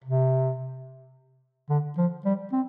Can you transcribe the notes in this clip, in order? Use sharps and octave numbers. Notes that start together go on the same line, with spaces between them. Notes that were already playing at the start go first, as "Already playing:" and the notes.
C3
D3
F3
G3
C4